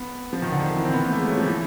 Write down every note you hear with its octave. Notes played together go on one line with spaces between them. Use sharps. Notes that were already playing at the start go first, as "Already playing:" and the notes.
Already playing: B3
F3
D#3
D3
D#3
E3
C4
B3
A#3
A3
G#3
F#3
F3
E3